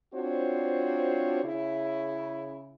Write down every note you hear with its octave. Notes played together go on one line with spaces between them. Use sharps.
C4 D4 F4 F#4 C5 C#5
C#3 E4